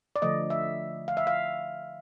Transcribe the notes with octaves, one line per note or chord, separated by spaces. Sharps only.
D5
D3 F3 A3 D#5
E5
F5
E5
F5